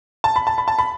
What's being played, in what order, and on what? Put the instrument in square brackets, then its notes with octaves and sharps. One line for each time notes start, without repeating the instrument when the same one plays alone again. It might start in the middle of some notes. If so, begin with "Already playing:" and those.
[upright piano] A5
B5
A5
B5
A5
B5